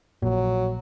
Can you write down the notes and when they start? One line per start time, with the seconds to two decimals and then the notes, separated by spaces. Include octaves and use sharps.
0.23 A#1 A#2 F#3